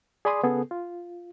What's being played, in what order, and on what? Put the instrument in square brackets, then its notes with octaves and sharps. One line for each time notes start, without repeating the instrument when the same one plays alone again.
[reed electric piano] G#4 D5 G#5 B5 C6 D#6
C#3 B3 G#4 A4
F4